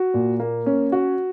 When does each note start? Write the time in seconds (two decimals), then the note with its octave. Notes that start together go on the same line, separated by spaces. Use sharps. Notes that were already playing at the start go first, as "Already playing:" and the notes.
Already playing: F#4
0.14 A#2
0.40 A#3
0.66 C#4
0.92 F#4